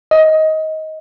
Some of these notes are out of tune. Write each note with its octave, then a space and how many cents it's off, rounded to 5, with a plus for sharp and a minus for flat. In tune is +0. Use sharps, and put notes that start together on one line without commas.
D#5 +15